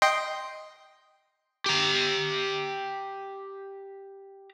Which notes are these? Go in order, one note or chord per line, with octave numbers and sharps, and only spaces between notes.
D#5 G5 C6
G4 A#5